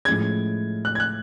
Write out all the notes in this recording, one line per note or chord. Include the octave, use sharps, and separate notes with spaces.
A2 F3 G#3 C#4 G#4 G#6
F#6
G#6
F#6